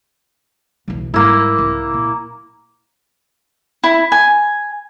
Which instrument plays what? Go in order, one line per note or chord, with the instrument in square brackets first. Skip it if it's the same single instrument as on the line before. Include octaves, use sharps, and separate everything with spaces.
[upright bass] B1 E2
[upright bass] G#2 G3 [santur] A#3 E4
[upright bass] C2
A#2
[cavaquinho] E4
G#5